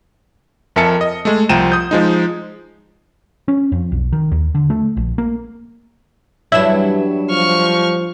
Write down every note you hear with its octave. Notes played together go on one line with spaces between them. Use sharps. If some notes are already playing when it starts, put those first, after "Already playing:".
F2 A#4 E5 G#5 A5 C#7
D#5
G#3 A3
C2 F3 G5 A#5 D#7 E7
D#6 G6
F3 G#3 D#4
C#4
F2
B1
D#3
D#2
D3
A3
A#1
A#3
G2 E3 F#3 D4 E4 E7
F3 C#6 F6